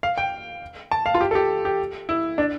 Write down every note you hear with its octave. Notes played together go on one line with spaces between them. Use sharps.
F5
G5
A5
F5
F4
G4
A4
G4
G4
E4
D4